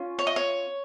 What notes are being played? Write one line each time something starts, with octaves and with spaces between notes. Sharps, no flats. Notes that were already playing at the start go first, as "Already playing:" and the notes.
Already playing: C#4 F4
C#5
D#5
C#5